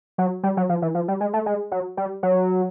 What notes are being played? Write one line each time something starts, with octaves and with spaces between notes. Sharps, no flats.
F#3
G3
F#3
F3
E3
F3
G3
G#3
A3
G#3
F#3
G3
F#3